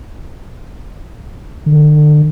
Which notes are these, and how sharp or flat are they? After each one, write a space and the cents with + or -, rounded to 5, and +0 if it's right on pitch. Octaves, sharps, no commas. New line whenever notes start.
D3 +35